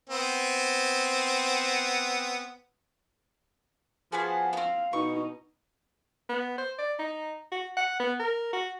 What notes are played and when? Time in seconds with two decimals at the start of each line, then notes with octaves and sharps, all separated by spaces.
0.10 B3 C4
4.12 F3 B3 F#4 G#4
4.53 B3 C4 F5
4.93 B2 D#4 C#6
6.29 B3
6.58 C5
6.78 D5
6.99 D#4
7.51 F#4
7.77 F#5
8.00 B3
8.19 A#4
8.53 F#4